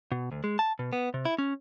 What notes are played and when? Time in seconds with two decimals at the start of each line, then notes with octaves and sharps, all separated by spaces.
0.12 B2
0.32 D2
0.44 G#3
0.59 A5
0.79 B2
0.93 B3
1.14 C3
1.25 E4
1.38 C#4